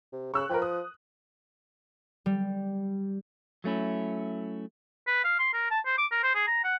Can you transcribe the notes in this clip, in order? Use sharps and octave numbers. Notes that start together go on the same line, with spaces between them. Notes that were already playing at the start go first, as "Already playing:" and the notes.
C3
C#3 C#6 E6 F#6
F3 A#4 B4 G5
D#6
G3
F#3 A3 C#4 E4
B4
F5
C6
A#4
A5
C5
D6
A#4
C5
G#4
A#5
F#5